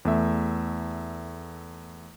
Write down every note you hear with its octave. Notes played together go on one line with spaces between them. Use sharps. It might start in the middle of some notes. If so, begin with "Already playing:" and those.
E2 A3 E5